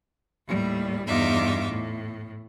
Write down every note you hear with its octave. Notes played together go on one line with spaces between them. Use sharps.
D#2 A2 G3
E2 G2 D#4 F4 E5 D6
A2